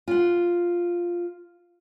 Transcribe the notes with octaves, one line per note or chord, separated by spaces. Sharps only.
F4 F#5